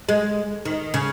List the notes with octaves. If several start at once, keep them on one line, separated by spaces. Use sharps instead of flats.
G#3
D#3
C#3